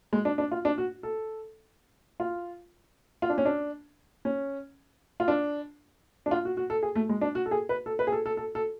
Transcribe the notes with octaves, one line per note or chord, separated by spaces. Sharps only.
G#3
D4
D4
F4
D4
F#4
A4
F4
F4
D4
C#4
D4
C#4
F4
D4
D4
F4
F#4
F#4
A4
G#4
A3
G#3
D4
F#4
A4
G#4
B4
A4
B4
G#4
A4
A4
A4
A4